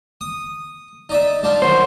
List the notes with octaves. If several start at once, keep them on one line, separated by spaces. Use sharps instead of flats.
D#6
D#4 D5 E5
G3 D4 F4
D#3 F#3 C5